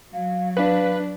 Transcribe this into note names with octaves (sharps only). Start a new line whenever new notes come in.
F#3 F5
D4 B4 F5